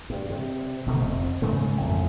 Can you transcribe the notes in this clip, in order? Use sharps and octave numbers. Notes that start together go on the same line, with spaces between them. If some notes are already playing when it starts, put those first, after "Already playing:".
G2
C3
D2 B2 D#3 A3
F1 F2
G#2 C#3 G#3 A3
A1 F2 A#2